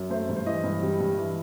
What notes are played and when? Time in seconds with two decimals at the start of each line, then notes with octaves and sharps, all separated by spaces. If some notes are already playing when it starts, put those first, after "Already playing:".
Already playing: F#2
0.10 A3 C5
0.29 G2
0.36 C5
0.46 E3 D#5
0.64 G2
0.83 G3
1.00 G2
1.18 E3